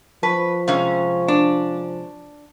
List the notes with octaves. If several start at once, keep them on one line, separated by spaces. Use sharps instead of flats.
F3 B4 A5 C#6 B6
C3 G#3 C#4 F5
D4